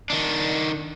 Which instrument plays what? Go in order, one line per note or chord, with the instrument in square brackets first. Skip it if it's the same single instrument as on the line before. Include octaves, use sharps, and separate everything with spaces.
[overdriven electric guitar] D#3 D4